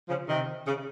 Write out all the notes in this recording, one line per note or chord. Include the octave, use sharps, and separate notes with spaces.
C#3 F3
C3 D#3
C#3